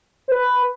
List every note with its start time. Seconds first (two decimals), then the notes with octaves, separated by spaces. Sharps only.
0.28 C5
0.32 B4